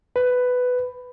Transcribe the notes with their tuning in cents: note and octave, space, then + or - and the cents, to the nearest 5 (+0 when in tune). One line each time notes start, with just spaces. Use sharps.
B4 +10